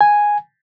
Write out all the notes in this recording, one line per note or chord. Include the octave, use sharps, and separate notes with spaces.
G#5